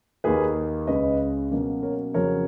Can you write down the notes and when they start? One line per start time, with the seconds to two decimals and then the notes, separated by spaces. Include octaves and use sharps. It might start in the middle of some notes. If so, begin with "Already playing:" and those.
0.24 D#2 D#3 A#3 G#4 B4
0.87 C#2 C#3 G#3 C#4 B4 D#5
1.51 B2 F#3 A#3 C#4
1.83 A#4 C#5
2.14 F2 C#3 F#3 A#4 C#5